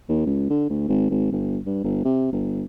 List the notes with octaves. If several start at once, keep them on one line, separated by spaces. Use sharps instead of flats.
D#2
C#2
D3
D2
G#1
G#1
G1
G2
G1
C3
G1